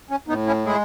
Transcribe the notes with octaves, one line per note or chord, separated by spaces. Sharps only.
C#4
A2 B3 D#4
C#4 E4
G#3 E4 G#4